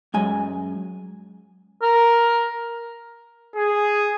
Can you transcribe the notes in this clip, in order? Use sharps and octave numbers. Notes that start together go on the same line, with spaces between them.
F#2 G#3 G#5
A#4
G#4